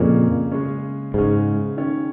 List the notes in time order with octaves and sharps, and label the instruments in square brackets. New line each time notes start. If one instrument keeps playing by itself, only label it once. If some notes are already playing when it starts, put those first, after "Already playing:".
Already playing: [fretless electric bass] F2 A#2 [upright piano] C#3 A#3 C#4
[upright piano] C#3 G#3 C#4
[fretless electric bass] G#2 [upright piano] C#3 G#3 C#4
[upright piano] D#3 C#4